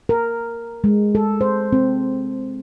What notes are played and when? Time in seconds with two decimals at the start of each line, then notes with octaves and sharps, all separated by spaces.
0.09 A#4
0.84 G#3
1.15 A4
1.41 C5
1.73 C4